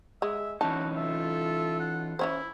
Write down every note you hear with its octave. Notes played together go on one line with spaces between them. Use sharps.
G#3 E5
E3 C#4 D#4 F#4 A5
F4 A4 E5
F#5
E3 C#4 E4 C5